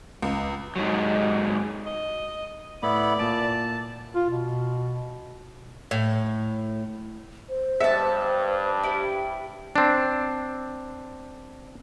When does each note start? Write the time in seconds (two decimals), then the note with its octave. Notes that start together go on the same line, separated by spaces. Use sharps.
0.22 C#2
0.76 G#2 F#3
1.86 D#5
2.83 A2 B3 E4 D5 B5
3.19 A#2 A5 D7
4.15 F4
4.30 B2
5.91 A2
7.49 C5
7.80 G2 B3 E5 A5
8.83 E4 G4 B4
9.76 C4 D4